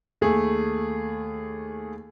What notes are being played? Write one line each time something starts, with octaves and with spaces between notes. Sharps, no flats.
D#2 A3 G#4